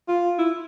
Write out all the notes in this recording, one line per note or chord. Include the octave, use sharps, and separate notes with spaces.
F4
E4